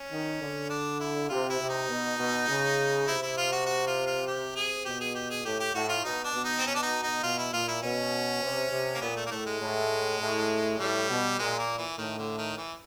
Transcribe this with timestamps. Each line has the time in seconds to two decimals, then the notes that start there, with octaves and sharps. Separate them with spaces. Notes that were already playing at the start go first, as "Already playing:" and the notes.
Already playing: C#4
0.11 D#3
0.40 D3
0.70 D4
1.00 E4
1.29 C3 F4
1.49 E4
1.59 C3
1.69 D#4
1.88 B2
2.18 B2
2.48 C#3
3.07 C3 E4
3.22 E4
3.37 F4
3.52 F#4
3.66 F#4
3.87 F4
4.06 F4
4.26 G4
4.55 G#4
4.85 B2 G4
5.00 G#4
5.14 G4
5.30 G#4
5.45 A2 G4
5.60 G4
5.74 A2 F#4
5.89 F4
6.04 B2 D#4
6.24 D4
6.34 B2
6.44 D#4
6.58 C4
6.67 C#4
6.75 D4
6.83 D#4
7.03 D#4
7.23 B2 F4
7.38 E4
7.53 A#2 F4
7.68 E4
7.82 B2 C#4
8.42 C3
8.71 C3
8.95 A#3
9.01 A#2 B3
9.16 A3
9.26 A#3
9.31 A2 A3
9.46 G#3
9.61 A2
10.20 A2
10.79 A2 G3
11.09 B2
11.39 A#2 G#3
11.59 A#3
11.78 E3
11.98 A2 D#3
12.18 D3
12.38 D#3
12.57 E3